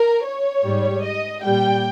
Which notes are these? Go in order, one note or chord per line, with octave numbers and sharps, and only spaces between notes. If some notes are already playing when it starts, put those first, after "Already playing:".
Already playing: A#4
C#5
G#2 G3
D#5
A#2 G3 G5